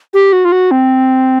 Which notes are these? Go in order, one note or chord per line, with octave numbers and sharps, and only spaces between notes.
G4
F#4
F4
F#4
C4